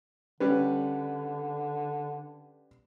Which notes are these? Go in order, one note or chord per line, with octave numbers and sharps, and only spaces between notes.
D3 G3 C#4 B4